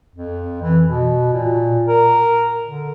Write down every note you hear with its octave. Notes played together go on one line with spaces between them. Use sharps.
F2
E3
B2
A#2
A#4
D3